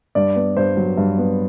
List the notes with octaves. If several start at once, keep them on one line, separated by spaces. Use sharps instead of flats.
G2 D5
B3
G2 C5
F#3
G2
B3